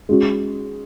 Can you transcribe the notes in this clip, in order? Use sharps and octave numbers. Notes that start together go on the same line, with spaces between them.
G#3 C#4 F#4